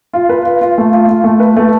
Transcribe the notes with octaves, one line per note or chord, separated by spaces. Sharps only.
F4
B4
F4
F4
A3
F4
F4
A3
B4
A3